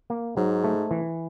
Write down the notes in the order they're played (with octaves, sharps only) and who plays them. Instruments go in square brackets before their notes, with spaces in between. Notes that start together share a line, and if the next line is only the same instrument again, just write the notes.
[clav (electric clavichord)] A#3
[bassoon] G#2 [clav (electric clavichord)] F#3
[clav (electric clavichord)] A3
E3